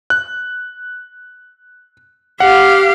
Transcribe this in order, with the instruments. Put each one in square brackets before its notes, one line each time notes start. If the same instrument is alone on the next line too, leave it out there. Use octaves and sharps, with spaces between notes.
[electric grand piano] F#6
[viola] G4 F5 [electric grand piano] F#5